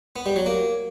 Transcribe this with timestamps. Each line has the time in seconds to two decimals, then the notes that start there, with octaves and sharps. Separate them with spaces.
0.16 B3
0.26 G3
0.36 F#3
0.46 A#3